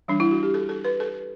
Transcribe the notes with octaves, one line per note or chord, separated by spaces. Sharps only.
E3 G3 D4
E4
F#4
G4
A4
A4
B4
A4